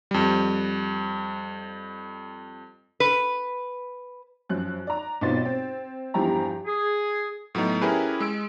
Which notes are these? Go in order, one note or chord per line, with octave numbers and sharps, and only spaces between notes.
F2 G3
B4
F#2 F3 F#3 F#6
D5 A#5
B1 B3 C4 F4 C6 A6
C4
E2 G2 F3 E4 G4 A#5
G#4
A2 F#3 B3 D#4
C#4 E4 G4 G#4 A#4 B4
G#3 E6 D7